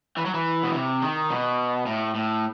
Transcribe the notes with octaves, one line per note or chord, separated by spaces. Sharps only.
E3
F#3
E3
B2
C3
D#3
B2
A2
A2